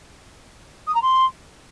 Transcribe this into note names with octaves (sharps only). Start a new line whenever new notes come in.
D#6
A#5
C6